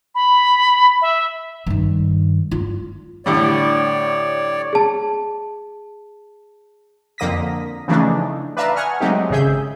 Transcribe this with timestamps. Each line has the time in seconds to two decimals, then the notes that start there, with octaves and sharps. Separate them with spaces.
0.15 B5
1.02 E5
1.67 G2 D#3
2.51 F4
3.26 A2 D3 G3 C#5 D5
4.73 G#4 A5
7.18 F2 D3 A#3 D#6 A#6 B6
7.88 C#3 E3 F3 A3 D4 D#4
8.57 B4 D5 E5 F5 A5 A#5
8.76 F#5 G#5 C#6 D#6 F6
9.00 F#3 G#3 A3 C4 D#4 G4
9.30 G#1 C#3 G#4 E5 G6